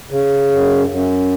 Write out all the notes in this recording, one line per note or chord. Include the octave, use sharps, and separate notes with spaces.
C#3
F#2
F#2